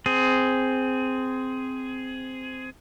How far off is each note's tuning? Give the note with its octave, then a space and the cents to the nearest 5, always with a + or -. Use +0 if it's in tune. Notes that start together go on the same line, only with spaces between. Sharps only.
C4 -10 G#4 +10